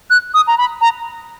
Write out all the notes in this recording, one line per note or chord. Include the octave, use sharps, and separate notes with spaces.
F#6
D#6
A#5
B5
A#5